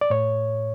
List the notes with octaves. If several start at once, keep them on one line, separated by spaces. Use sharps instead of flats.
D5
A2 C#5